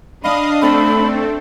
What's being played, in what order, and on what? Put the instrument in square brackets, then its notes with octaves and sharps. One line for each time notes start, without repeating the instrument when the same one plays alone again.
[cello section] D4 [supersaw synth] D#5 F5 D#6 [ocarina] B5
[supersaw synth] A3 C4 A4 [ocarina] B5